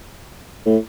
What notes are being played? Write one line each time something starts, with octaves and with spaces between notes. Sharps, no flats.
A2